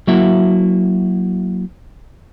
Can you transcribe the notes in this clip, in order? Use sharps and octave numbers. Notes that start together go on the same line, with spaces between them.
F#3 A#3 E4 F#4 E5